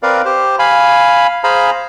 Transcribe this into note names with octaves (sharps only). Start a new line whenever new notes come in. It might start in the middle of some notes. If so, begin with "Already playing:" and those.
C4 A#4 B4 D5 F5
G4 C5
F5 G#5 B5
G#4 C5 F5 G#5 A#5 B5